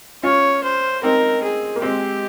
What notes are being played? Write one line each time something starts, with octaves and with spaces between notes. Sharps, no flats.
C#4 F4 C#5
C5
C4 D#4 A#4
G#4
A#3
G#3 C4 G4